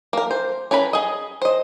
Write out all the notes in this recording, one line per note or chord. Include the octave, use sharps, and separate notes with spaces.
A#3 A#4
C5
C#4 A#4 B4 B5
G#4 D#5
C5 D#5